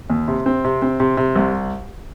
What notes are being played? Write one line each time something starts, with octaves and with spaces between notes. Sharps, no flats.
D#2
C3
C4
C3
C4
C3
C3
C2